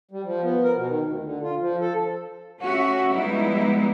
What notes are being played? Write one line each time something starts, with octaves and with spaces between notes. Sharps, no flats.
G3
F3
B3
A#4
B2
D#3
D2
D3
F4
F3
A4
A3 C#4 F#4 E5
F3 G3 G#3 B3 D#4 E4